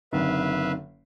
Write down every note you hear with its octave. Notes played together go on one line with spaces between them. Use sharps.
F#1 D3 C4 D#4 B4 E5 F5